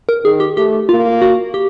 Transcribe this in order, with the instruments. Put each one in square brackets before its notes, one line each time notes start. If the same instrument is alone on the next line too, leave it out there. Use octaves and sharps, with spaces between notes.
[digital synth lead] A#4
[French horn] D#3 [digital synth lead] G#4
[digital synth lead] G4
[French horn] A3 [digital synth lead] G4
[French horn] A#3 [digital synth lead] F4
[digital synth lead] F#4
G4